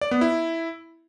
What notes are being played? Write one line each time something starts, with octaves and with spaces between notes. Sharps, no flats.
D5
B3
E4